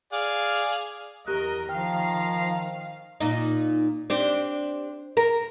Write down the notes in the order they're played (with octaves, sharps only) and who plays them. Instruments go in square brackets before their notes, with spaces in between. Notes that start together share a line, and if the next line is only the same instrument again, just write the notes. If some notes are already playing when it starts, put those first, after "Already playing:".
[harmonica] G#4 D5 F5
[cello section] E2 A#4 [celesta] G4 F#6 [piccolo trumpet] D#5
[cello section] D#3 F5 [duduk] F3 [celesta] G5 F6 [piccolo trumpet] A#5
[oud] A#2 D#4
C4 D4 G4
A#4